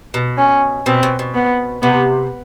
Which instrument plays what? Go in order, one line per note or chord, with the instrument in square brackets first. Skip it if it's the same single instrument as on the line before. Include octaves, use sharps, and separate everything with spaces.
[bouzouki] B2
[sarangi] C#4
[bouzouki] B2 [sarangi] C4
[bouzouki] B2
B2
[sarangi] B3
[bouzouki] C3 [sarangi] B3